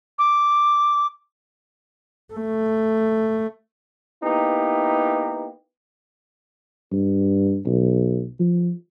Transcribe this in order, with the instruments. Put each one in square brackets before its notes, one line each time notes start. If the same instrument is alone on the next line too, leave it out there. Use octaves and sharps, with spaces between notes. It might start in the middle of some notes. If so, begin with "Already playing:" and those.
[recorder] D6
[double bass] A3
[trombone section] A#3 B3 D#4 E4 G4
[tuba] G2
B1
F3